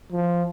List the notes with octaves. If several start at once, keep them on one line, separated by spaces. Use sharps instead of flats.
F3